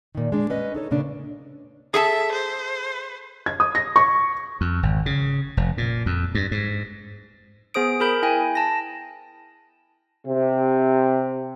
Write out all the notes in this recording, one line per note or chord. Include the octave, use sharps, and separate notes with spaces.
A#2 D#3
G#3 D4
C#4 B4 D#5
D#4 A4 C#5
A#2 C#3 C#4 D4
G#4 A4 E5 A5
C5
G#6
D#6
A#6
C#6
F2
G#1
C#3
F1
A#2
F2
G2
G#2
B3 G#4 C5 D#6 D7
G#4 A#4 B5 G6
E4 G5 G#5
A5 A#6
C3